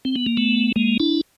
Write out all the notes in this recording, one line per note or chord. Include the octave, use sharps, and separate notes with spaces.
C4
B3
A#3
A3 B3
G#3 A#3
D4 E4